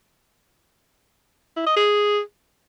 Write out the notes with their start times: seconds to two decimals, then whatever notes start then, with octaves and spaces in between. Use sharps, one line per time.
1.57 E4
1.67 D#5
1.77 G#4